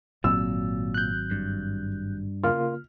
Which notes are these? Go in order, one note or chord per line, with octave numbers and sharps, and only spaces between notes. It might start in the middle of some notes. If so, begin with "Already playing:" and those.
G#1 A#2 F#3 C4 E6
F#6 G6
G2
C#3 A#3 F4 F6